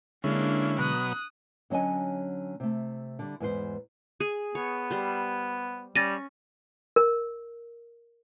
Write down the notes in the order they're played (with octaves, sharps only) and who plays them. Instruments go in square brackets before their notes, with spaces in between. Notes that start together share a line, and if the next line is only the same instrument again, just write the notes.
[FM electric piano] D3 G#3 [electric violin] A#3 D4 [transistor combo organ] C#4 E4
[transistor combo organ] B2 F#3 B3 [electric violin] D#6 F#6
[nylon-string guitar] D3 F#3 C#4 D#5 G#5
C3 A3
D3 G3
E2 G#2 B4 C5
[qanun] G#4
[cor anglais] B3 [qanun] C#5
[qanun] G3 C5
[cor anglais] G3 [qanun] C#4 [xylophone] A6 A#6 D#7
[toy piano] A#4